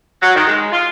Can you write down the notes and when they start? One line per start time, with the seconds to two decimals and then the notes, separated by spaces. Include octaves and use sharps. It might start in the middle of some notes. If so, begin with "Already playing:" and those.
0.22 F#3
0.35 D#3
0.47 G#3
0.71 F4